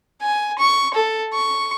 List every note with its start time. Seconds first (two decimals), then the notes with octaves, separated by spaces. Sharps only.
0.22 G#5
0.59 C#6
0.94 A4
1.33 C#6